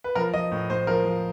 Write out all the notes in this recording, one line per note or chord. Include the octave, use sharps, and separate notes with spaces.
B4
F3 A#4
F3 D#5
A2
A2 C5
F3 A#4
F3